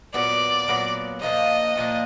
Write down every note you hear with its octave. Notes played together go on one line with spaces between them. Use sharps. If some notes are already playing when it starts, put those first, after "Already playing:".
A#2 F#3 B3 D5
A#2 F#3 B3
A#2 F3 A#3 D4 D#5
A#2 F3 A#3 D4